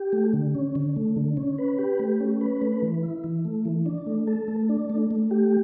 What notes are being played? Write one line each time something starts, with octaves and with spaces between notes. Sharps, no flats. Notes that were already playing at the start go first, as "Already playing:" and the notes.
Already playing: G4
A3
D3
C#4
D3
A3
D3
C#4
B4
G4
A3
C#4
B4
A3
E3
E4
E3
A3
E3
D4
A3
A4
A3
D4
A3
A3
G4